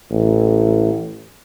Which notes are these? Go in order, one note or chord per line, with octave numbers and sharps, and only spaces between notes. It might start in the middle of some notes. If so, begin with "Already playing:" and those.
A1